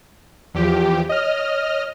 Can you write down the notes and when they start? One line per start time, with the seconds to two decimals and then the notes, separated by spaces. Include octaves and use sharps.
0.55 E2 F3 G4
1.09 C#5 D#5 F6